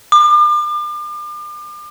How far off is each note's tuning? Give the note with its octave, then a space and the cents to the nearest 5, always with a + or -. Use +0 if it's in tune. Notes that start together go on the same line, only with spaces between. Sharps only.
D6 +40